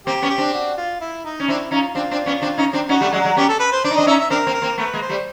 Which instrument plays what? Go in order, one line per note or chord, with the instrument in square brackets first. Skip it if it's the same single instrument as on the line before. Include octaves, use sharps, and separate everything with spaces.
[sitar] A#3 C4 [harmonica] G4
[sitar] B3 C#4
[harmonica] G4
[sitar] C4 D4
[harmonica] F#4
F4
E4
D#4
[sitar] C#4
[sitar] C4 D4 [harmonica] E4
[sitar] C#4 D#4 [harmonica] F4
[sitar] C4 D4 [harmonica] F4
[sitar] C4 D4
B3 C#4
C4 D4
C#4 D#4
C4 D4
[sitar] C#4 D#4 [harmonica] F#4
[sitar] G3 A3
[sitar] F#3 G#3 [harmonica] F#4
[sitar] F#3 G#3
[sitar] B3 C#4 [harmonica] G4
[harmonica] A4
B4
C5
[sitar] D4 [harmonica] D5
[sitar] D#4
[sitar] C4 D4 [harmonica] D#5
[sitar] C#4 D#4 [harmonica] E5
[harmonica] E5
[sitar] C4 D4 [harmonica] A#4
[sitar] A#3 C4
[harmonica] A#4
[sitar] A#3 C4
[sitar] A3 B3 [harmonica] B4
[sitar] G#3 A#3
[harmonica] C5
[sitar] G3 A3